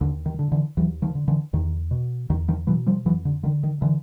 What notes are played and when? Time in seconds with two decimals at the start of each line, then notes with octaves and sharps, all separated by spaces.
0.01 D#2 D3
0.26 D#3
0.39 D3
0.52 D3 E3
0.77 D#2 E3 F#3
1.02 D#3 F3
1.15 D3
1.28 D3 E3
1.53 E2 D#3
1.91 B2
2.30 E2 D#3
2.48 D#3 F3
2.67 B2 E3 F#3
2.86 F3 G3
3.05 F2 E3 F#3
3.25 D3
3.43 D3 D#3
3.63 D#3
3.82 D3 E3